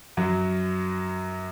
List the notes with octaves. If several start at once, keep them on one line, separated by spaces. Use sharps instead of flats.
F#2 F#3